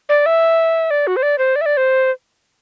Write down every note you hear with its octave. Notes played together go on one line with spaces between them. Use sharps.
D5
E5
D5
F#4
C5
D5
C5
D5
E5
D5
C5